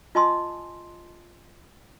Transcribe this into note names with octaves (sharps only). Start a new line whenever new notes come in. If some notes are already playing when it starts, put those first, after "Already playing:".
F4 D#5 G#5 A5 C6 D#6